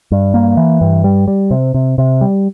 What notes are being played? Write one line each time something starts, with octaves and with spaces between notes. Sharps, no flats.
G2
A#3
E3
G2
G3
G3
C3
C3
C3
G3